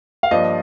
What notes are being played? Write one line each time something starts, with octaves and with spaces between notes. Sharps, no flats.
F5
G2 F3 A#3 D4 D#5